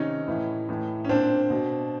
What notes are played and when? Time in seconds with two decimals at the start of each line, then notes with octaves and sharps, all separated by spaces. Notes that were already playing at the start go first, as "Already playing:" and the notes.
Already playing: C3 D#3 C#4 D#4
0.28 A2 E3
0.69 A2 E3
1.05 C#4
1.09 A#2 C4 D4
1.50 B2